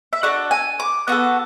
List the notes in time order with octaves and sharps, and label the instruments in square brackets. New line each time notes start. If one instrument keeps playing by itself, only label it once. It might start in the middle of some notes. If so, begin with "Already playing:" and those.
[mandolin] E5
D4 F#4 A4 F#5
G#5
D6
B3 F#4 A4